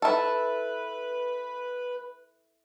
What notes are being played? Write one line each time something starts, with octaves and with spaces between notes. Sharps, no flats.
E4 A4 B4